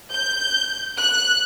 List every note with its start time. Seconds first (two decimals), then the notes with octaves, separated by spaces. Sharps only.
0.12 G6
0.99 F#6